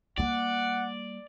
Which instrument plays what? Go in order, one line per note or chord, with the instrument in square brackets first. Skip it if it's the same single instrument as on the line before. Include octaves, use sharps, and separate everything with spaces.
[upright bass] G3 A#3 [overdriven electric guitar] D5 [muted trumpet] F#5